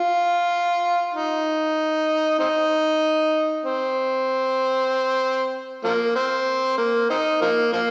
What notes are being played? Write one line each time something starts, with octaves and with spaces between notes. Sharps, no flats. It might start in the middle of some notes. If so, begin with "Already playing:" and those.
Already playing: F4
D#4
C4 D#4
C4
F3 A#3
C4
A#3
C4 D#4
F3 A#3
F3 A#3